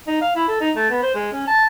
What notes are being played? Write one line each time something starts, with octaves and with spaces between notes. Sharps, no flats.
D#4
F5
E4
A4
D#4
A3
B3
C5
G#3
C#4
A5